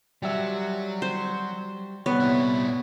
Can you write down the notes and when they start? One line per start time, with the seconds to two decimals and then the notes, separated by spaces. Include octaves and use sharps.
0.22 F#3 G3 G4 E5
1.02 C5
2.06 C2 G3 B3 C#5
2.20 A#2 E4